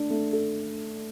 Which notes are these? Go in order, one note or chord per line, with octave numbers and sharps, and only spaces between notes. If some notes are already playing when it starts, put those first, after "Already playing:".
Already playing: A3 D4
A3
A4